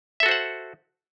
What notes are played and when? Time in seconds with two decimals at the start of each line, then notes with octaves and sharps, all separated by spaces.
0.20 E5
0.23 A4
0.26 F#4
0.29 C5
0.31 F#5